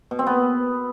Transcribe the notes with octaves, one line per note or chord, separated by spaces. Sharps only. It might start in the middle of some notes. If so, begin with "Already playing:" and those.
B2
C4
B3